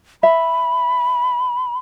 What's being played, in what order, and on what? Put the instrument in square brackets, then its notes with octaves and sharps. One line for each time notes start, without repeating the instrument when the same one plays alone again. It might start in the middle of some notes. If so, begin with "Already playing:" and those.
[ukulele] E5 [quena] B5